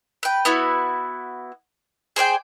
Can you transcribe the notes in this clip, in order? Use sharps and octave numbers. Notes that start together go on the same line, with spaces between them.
B4 G5
B3 E4 F#4
G#4 C5 D5 G5